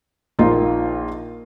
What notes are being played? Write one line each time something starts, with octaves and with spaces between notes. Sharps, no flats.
A#1 A#3 D#4 F4